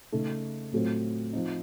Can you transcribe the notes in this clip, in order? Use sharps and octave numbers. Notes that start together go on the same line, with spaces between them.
C#3 A3 D#4
A2 F#3 A3 C4 F4
F3 C4 D#4